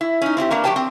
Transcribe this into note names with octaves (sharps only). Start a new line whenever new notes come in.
E4
C#4 D#4
C4 E4 F4 G4
A#3 B3 D4 A#4
F#3 G4 G#4 C5 G5 A5
C4